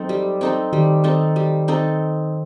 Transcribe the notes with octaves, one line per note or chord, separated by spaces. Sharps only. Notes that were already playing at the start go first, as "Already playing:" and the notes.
Already playing: F#3 C4 D#4 A4
G3
C4 D#4 A4
D#3 G3
C4 D#4 A4
G3
C4 D#4 A4